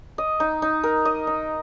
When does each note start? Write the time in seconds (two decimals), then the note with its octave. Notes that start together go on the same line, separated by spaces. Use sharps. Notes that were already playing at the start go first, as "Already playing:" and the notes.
0.18 D#5
0.40 D#4
0.62 D#4
0.83 A#4
1.05 D#5
1.27 D#4